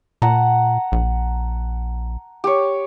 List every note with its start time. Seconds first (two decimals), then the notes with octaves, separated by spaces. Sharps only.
0.22 A#2 F#5 A5 A#5
0.92 A#1
2.44 G4 C#5